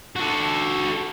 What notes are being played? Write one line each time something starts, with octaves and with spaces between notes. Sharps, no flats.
F#4 A4